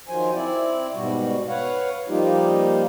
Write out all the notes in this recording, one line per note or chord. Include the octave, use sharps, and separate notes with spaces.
D#3 F3 F#3 C5 G#5
C4 E4 D5
G#2 B2 G3 F#4
B4 C#5 F5 F#5
F3 G3 A#3 D#4 F4 G4